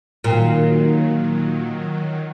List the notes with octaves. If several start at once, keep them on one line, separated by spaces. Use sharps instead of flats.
A#2 D#3 F#3